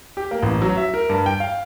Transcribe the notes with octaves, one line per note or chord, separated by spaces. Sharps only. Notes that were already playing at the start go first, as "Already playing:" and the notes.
G4
A#3
A1
F#3
E5
A#4
G2
G5
F5